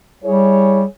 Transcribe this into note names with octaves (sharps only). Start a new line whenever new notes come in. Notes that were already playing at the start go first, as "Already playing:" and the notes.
G3 E4 G#4 C#5